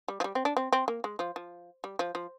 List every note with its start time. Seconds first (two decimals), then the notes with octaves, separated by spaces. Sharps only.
0.08 G3
0.20 F3
0.24 G3
0.35 C4
0.45 D4
0.57 C4
0.72 C4
0.88 A#3
1.04 G#3
1.19 F3
1.36 F3
1.84 G3
1.99 F3
2.15 F3